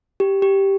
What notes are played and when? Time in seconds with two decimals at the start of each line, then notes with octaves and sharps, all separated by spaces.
0.20 G4
0.42 G4